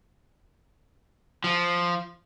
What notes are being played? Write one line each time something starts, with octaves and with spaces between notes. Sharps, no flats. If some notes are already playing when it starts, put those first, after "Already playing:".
F3